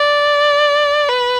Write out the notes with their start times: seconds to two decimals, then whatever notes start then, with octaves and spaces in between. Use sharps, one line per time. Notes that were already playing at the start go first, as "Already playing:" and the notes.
Already playing: D5
1.08 B4